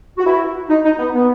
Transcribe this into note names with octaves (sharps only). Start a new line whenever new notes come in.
F#4
E4
D#4
D#4
B3
B3